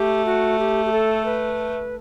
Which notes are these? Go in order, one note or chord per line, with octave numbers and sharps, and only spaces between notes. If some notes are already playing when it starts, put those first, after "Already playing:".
Already playing: A3 G4
F#4
G4
G4
A4
B4